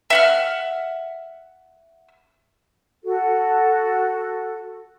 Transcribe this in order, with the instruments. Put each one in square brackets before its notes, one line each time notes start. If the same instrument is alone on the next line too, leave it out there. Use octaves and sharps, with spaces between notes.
[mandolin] E5 F#5 F6
[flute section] F#4 A4